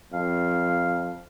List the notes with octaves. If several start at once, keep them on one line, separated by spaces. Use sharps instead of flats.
F2 F5